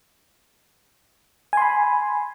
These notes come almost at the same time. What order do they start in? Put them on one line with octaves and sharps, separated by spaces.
G#5 C6 B5